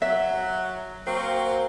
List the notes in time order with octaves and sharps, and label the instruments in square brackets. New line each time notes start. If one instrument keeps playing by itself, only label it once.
[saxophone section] F#3 [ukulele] E5
[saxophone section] F#3 A#3 C4